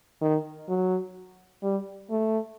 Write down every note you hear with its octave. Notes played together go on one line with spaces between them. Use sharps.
D#3
F#3
G3
A3